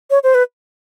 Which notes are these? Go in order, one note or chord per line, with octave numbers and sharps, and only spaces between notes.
C#5
C5
B4